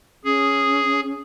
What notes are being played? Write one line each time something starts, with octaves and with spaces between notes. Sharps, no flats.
C#4 G#4